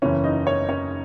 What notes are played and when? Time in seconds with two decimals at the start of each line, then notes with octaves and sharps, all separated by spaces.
0.02 F#1 E2 C#3 E3 C#4 C#5
0.24 D#4 D#5
0.47 C#4 C#5
0.69 C#4 C#5